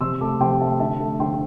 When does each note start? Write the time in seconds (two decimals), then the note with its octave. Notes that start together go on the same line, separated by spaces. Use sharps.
0.01 C3 C6 E6
0.21 A3 A5 D6
0.40 C3 G5 C6
0.60 A3 E5 A5
0.79 D3 E5 A5
1.00 A3
1.19 D3 G5 C6